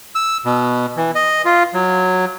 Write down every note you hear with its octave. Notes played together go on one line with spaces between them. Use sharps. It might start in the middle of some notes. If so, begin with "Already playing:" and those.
E6
B2
E3
D#5
F4
F#3